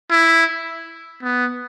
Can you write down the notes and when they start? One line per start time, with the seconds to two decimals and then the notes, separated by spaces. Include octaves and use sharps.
0.11 E4
1.23 B3